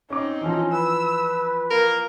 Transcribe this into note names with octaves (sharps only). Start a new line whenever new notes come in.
C4 C#4 D#4 D6
E3 F3 C#4
B4 E6
A#3 A#4